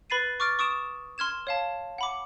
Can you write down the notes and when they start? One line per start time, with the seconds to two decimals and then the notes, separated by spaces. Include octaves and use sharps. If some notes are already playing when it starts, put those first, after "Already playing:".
0.10 B4 B5 A6 C7 D#7
0.40 C#6 D6 F6 A6 D7
0.59 C#6 D#6 D7 E7
1.18 C6 F6 G#6 E7
1.47 C#5 F5 A5
1.98 F#5 B5 D6